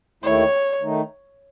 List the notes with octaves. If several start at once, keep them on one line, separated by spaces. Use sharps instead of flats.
D#2 D#3 A3 E4 C#5
D#3 A3 D#4